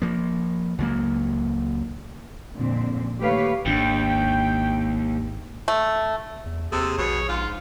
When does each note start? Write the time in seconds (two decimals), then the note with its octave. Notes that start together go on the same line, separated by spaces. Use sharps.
0.02 F3 A#3
0.78 C#2 F#3 A#3
2.55 F2 A#2 D3 C4
3.20 D#2 A3 G4 B4 C#5 F5
3.66 G#1 D#2 C#4 D4 G5
5.68 A3
6.46 E2
6.72 D#2 C3 G#4 A4
6.98 A#1 B2 C#5
7.29 G#2 F4